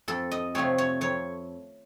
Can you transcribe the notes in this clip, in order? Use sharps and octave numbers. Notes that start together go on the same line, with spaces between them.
F2 A4
D#5
C3 F3 A3 C4 C#5
C#5
F2 C#5